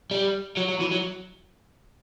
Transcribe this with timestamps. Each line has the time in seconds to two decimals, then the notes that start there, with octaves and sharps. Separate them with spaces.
0.11 G3
0.57 F#3
0.68 F#3
0.80 E3
0.91 F#3